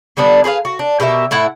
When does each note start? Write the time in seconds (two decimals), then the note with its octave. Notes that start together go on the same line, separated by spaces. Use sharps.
0.17 D3 G3 B3 D4
0.44 G#4 B4 C5 F5
0.65 F#4
0.79 D4
1.00 B2 G4 A#4 E5
1.31 A2 E4 F#5